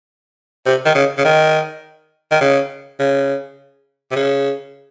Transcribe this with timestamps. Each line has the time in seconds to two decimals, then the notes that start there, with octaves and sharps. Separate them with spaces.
0.66 C3
0.85 D#3
0.95 C#3
1.18 C#3
1.25 D#3
2.31 D#3
2.41 C#3
3.00 C#3
4.11 C3
4.16 C#3